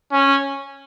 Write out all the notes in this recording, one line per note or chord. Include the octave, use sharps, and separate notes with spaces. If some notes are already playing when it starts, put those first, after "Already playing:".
C#4